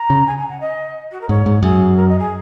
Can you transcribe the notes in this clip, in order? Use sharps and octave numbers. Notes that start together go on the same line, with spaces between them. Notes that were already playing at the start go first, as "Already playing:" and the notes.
Already playing: A#5
C#3
G#5
G#5
F#5
D#5
F#4
A#4
G#2 C#5
G#2
F#2 G#4
A#4
D#5
G#4